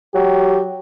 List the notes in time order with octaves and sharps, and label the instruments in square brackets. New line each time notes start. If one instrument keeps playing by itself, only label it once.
[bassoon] F#3 [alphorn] G4